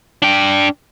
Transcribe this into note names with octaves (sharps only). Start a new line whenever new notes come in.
D4 G5